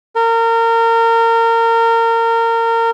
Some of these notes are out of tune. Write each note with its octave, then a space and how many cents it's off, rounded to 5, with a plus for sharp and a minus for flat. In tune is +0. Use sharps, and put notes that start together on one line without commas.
A#4 -25